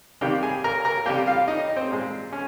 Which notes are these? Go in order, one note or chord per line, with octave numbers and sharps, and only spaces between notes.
C3 D#3 G3 A#3 G4 G5
G#4 G#5
A#4 A#5
A#4 A#5
C3 G3 A#3 G4 G5
F4 F5
D#4 D#5
C4 C5
A#2 G#3
C#4